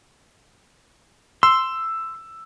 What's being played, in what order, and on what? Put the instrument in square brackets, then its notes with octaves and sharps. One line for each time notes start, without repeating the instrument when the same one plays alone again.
[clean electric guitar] C6 [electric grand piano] E6